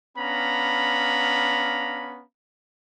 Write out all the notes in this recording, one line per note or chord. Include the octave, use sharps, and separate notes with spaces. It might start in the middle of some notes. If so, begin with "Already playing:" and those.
B3 C#4 D4 F5 A#5 B5